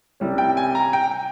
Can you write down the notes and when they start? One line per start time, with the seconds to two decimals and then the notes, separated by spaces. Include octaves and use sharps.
0.20 C2 C3 G3 C#4
0.38 G5
0.57 G#5
0.75 A#5
0.93 G5